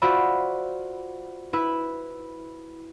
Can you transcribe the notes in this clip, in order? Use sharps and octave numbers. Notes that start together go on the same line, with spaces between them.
F4 F#4 C5 D5 E5 B5
E4 B4 E5